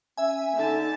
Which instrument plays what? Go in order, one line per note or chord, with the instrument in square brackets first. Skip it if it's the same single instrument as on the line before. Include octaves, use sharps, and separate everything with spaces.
[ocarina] C#4 [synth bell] E5 G#5
[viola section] D3 A5 [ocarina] D#4